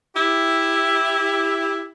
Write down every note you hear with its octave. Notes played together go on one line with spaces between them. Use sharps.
E4 G4